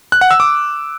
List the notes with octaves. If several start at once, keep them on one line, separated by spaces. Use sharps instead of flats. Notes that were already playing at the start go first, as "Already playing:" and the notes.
F#6
F#5
E6
D6